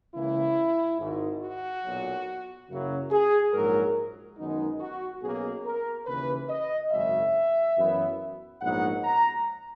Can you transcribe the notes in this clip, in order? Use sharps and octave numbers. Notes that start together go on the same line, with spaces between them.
C#2 C#3 E3 A#3 E4
G#1 G#2 D#3
F#4
B1 A#2 F#3
F#2 C#3 F#3 A#3 E4
G#4
A#1 G#2 F#3 A#4
F#2 D#3 G#3 B3 D#4
F#4
B1 B2 A#3 C#4 G#4
A#4
D#2 C#3 E3 B4
D#5
G#1 F#2 C#3 G#3 E5
F#2 E3 B3 E4
A#1 G#2 F#3 B3 D#4 F#5
A#5